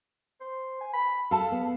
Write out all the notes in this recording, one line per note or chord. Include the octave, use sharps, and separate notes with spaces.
C5
G#5
B5
A4 F5 A5
B3